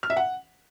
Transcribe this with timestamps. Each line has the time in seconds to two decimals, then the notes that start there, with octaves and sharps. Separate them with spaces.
0.03 F6
0.10 E5
0.17 F#5